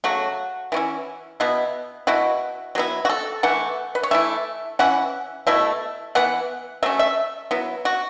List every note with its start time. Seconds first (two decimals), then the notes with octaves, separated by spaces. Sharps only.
0.04 C#3 F#3 A3 F#4
0.72 E3 C#4 E4
1.40 B2 B3 E4
2.07 B2 B3 E4 F#4
2.75 F#3 B3 E4
3.05 F#4
3.10 A4
3.43 E3 A3 E4 F#5
3.95 B4
4.03 C#5
4.11 E3 A3 E4 E5
4.79 E3 C#4 E4 F#5
5.47 B2 A3 E4 E5
6.15 E3 B3 E4 F#5
6.83 F#3 A3 C#4 E5
6.99 E5
7.51 F#3 B3 E4
7.85 F#4